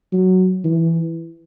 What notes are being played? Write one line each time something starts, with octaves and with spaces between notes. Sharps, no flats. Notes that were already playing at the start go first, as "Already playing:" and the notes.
F#3
E3